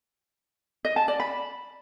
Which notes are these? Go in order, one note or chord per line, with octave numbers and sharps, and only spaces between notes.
D#5
A5
D5
B5